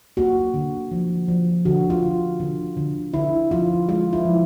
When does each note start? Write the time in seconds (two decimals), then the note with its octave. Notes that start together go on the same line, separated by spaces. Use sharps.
0.17 A#3 F#4
0.54 D3
0.91 F3
1.28 F3
1.65 D3 F#4
1.90 F4
2.02 D3
2.40 D3
2.77 D3
3.14 D3 E4
3.51 F3 F4
3.88 G#3 F4
4.13 E4
4.25 F3